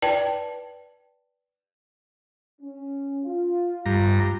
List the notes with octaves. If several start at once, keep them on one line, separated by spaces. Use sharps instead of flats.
B4 D5 G5 A5
C#4
F4
G2 A#5